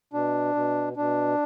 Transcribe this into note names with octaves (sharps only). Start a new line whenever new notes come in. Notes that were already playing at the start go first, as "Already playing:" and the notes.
B2 D4
B2
B2 D4